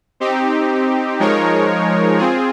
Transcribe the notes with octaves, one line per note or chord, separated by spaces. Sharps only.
C4 D#4 G4
F3 G#3 D#4 A#4 C#5
C4 F4 G#4